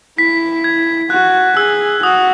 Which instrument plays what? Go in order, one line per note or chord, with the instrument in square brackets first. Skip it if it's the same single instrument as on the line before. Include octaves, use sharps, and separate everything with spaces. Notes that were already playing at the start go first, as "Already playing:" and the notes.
[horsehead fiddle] E4 [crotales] B6
[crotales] G#6
[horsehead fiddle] F#4 [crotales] F#6
[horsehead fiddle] G#4 [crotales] E6
[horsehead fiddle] F#4 [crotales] D#6